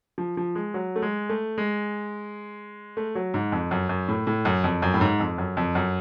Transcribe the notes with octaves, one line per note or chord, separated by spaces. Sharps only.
F3
F3
G#3
F#3
A3
G#3
A3
G#3
A3
F#3
G#2
F2
F#2
F#2
A2
A2
F#2
F2
F#2
A2
G#2
F2
F#2
F2
F#2